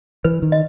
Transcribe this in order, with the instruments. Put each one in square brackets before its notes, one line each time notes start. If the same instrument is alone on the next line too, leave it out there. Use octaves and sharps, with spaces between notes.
[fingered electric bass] E3 [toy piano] B4
[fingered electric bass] D#3
[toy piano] D#5